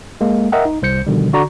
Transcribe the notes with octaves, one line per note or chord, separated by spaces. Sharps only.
G#3 A#3
A#4 D#5 E5 F#5 G5
D#4
C2 C5 G6 C#7
B2 D3 D#3 F3 G3
D3 F#4 D5 A#5 C#6